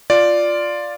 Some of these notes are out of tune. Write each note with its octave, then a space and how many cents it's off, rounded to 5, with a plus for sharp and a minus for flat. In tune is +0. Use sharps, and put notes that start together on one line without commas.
F4 +0 D5 +0